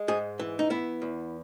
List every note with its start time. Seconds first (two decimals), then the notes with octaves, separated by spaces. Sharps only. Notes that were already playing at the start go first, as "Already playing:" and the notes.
Already playing: G#3
0.08 G#2 G#4
0.39 E3
0.59 D#4
0.70 B3 E4
1.02 E2